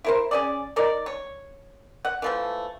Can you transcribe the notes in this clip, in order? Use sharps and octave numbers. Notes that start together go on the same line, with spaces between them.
E4 A#4 C5
C#4 G#4 D5
D#4 A#4 D5
C#5
F#5
E3 F3 A3